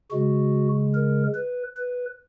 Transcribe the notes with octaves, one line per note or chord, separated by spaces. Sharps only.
C#3 G#3 F#4
A#4
B4
B4